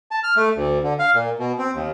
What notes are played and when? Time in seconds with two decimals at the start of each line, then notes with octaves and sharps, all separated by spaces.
0.11 A5
0.23 F6
0.37 A3
0.56 D2
0.83 D3
0.99 F5
1.15 A#2
1.39 B2
1.59 C4
1.75 D#2